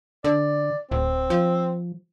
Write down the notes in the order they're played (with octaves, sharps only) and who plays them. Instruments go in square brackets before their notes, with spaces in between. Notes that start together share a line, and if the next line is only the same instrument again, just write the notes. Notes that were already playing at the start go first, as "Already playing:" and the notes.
[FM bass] D3 [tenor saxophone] D5
[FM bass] D1 [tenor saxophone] C4
[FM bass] F3